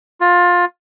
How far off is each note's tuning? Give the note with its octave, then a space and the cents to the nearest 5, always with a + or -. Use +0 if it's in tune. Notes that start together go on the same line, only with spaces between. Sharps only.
F4 +20